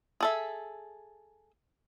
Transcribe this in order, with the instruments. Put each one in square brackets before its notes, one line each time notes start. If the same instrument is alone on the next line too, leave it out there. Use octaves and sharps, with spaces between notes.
[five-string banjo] G#4 A4 E5